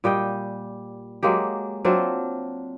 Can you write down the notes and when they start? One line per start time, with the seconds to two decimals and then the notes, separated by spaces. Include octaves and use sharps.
0.04 A#2 G3 D#5 G5
1.23 F#3 G#3 A#3 G4
1.85 F#3 C4 D4 F4